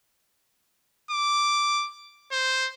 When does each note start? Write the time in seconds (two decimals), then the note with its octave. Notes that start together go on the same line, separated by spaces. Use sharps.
1.11 D6
2.32 C5